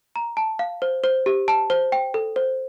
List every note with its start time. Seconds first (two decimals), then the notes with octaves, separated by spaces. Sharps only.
0.16 A#5
0.37 A5
0.59 F5
0.82 C5
1.04 C5
1.26 G4
1.48 A5
1.70 C5
1.92 G5
2.14 A4
2.36 C5